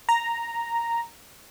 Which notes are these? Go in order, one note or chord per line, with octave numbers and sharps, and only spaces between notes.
A#5